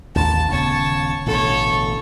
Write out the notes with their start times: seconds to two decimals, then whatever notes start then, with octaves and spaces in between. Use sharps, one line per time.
0.15 A1 D#2 A5
0.51 D#1 C#3 B3 C#5 A5
1.26 A1 B2 D3 A4 C#5